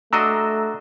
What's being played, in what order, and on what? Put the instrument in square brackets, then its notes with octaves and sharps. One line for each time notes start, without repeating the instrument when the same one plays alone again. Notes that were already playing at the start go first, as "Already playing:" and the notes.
[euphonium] A3 [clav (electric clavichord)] D4 F#4 D#5 [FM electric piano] A#5 E6